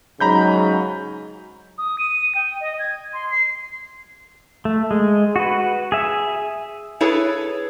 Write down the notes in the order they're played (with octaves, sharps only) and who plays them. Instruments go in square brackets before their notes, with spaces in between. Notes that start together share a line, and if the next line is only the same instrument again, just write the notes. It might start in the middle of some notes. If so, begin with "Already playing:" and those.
[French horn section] G#2 C#3 F#3 [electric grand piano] A#5 B5 G6
[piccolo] D#6
D#7
G5
D#5
G#6
C6
C7
[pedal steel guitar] A3
G#3
F#4 B4
G#4 E5
[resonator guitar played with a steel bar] E4 G#4 A4 B4 C#5